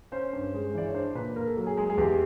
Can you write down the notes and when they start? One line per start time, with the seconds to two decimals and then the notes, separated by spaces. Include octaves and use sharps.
0.12 C#4 C5
0.33 G2
0.54 G#3
0.75 E3 D5
0.86 C#5
0.94 D4 C5
1.15 A#2 B4
1.36 A#3 A#4
1.47 A4
1.57 F#3
1.67 G#4
1.77 G#3 G#4
1.90 G#4
1.98 E2 G4